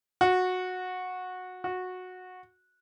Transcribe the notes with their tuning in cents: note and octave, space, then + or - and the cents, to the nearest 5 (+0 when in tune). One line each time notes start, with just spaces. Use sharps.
F#4 -15
F#4 -15